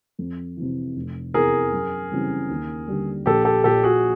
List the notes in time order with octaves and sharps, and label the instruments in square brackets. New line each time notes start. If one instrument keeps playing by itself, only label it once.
[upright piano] F2
C3 E3
F1
[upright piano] E2 C3 E3 [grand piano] G#4 A#4
[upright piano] F#2
C#3 E3 G3 C4
D#2
D3 G3
[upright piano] A#1 [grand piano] G4 A4
[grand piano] G4 A4
[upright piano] A#2 F3 [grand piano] G4 A4
[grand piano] F#4 G#4